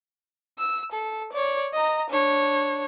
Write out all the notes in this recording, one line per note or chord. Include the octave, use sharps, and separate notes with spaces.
E6
A4
C#5 D5
D#5 A#5
D4 C#5